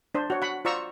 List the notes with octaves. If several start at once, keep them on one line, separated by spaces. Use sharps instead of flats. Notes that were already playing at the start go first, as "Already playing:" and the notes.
D4 C5
F#4 C#5
F#5 B5
F4 C5 D5 A#5 C#6 E6